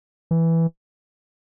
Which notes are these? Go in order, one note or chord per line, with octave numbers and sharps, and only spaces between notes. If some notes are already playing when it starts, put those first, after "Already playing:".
E3